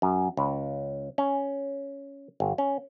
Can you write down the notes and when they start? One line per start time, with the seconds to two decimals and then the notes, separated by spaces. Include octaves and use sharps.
0.02 F#2
0.37 C#2
1.18 C#4
2.40 G1
2.58 C#4